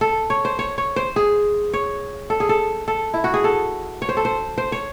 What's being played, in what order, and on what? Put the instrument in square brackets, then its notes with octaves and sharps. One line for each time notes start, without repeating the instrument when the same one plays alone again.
[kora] A4
C#5
C5
C#5
C#5
C5
G#4
C#5
A4
G#4
A4
A4
E4
F#4
G#4
A4
C#5
C5
A4
C5
C5
C#5